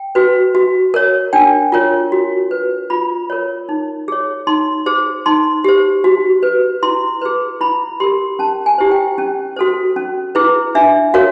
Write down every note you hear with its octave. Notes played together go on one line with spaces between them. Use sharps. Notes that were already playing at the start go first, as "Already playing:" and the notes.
Already playing: G5
F#4 B4
F#4
A#4 C#5
D4 G5
F4 A#4 C#5
F#4
B4
F4 B5
A#4 C#5
D#4
G#4 C#5
D#4 C6
G#4 C5
D#4 C6
G4 C5
F#4
B4
E4 C6
G#4 B4
E4 B5
G4 A#4 C6
C#4 A5
G#5
E4 G4 C5
G5
C#4
F#4 A4 C5
C#4
E4 G#4 B4
D4 E5
F#4 A#4 C#5 F5